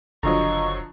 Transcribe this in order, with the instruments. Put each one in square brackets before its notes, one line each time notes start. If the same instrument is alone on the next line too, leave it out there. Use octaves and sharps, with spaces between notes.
[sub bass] F#1 [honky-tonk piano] D3 F3 F#3 [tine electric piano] D#5 A#5 [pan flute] C#6